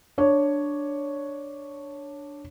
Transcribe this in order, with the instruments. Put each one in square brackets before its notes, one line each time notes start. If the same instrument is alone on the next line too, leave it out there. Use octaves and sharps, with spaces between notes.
[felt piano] D4 C#5